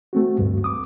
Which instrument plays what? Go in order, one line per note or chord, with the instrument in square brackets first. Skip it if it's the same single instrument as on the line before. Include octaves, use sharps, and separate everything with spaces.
[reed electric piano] A3 C4 F#4
D2 G2
D6 D#6